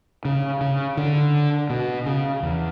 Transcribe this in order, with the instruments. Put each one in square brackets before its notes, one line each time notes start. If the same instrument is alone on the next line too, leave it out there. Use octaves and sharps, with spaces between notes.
[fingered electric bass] C#3
C#3
D3
B2
C#3
E2